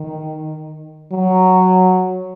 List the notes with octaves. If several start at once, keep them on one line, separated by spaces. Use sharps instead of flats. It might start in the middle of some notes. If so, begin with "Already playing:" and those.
Already playing: D#3
F#3